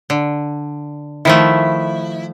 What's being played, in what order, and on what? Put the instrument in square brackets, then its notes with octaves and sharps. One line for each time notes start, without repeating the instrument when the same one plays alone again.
[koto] D3
[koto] D#3 F3 A3 [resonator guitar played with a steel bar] E4